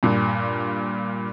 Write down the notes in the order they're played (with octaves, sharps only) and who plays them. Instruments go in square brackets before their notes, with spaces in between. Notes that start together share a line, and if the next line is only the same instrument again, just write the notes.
[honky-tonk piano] G2 A#2